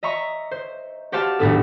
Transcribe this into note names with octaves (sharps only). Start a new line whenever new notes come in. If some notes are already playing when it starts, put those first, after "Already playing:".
D#5 E5 A#5 C#6
C5
F#4 G4 C5 F5 A5
D#1 B1 A2 B3 D4 A4